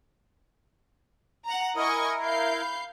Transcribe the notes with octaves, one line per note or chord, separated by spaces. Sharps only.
F#5 A#5
E4 A#4 D#5 G#5 C#6 D#6
E5 F5 G6 C7
B5